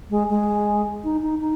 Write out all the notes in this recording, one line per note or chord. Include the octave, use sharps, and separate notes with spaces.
G#3
G#3
D#4
D#4
D#4